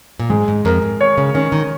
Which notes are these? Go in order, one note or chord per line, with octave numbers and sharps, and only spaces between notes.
A#2
G#2 G#3
G#2
F2 A#4
G#2
C#5
C#3
D#3 C#4
D#3